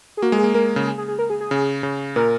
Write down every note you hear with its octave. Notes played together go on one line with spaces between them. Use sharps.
G#4
A#3 F#4
G#3
G#4
A#3
A#3 A#4
C#3
G#4
G#4
G#4
A#4
G#4
G#4
C#3
C#3
A#2 A#4